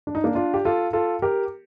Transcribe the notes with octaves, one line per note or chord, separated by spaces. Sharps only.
D4
D#4
A#3 D4
D4 F4
G4
F4 A4
F4 A4
G4 A#4